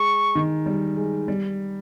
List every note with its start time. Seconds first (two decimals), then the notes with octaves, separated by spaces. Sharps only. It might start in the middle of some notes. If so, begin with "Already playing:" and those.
Already playing: G#3 C#6
0.35 D#3
0.66 G3
0.97 G#3
1.28 G3